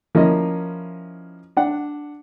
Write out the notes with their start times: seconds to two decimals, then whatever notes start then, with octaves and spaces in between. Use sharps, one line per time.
0.15 F3 A#3 C#4 E4 F4 D#5
1.57 D4 F#5